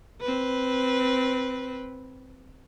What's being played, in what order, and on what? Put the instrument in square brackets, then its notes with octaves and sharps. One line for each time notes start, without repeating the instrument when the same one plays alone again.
[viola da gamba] C4 B4